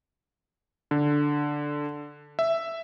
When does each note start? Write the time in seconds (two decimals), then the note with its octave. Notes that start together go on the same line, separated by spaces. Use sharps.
0.91 D3
2.39 E5